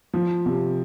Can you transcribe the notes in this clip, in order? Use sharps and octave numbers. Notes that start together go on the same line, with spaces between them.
F3
C3